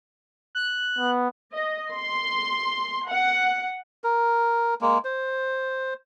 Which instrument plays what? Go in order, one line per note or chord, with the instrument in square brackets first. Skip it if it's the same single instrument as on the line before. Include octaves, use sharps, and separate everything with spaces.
[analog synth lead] F#6
[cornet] B3
[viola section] D#5
C6
F#5
[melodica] A#4
G#3 A#3
C5